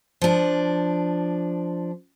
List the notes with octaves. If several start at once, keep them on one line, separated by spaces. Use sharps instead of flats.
F3 D4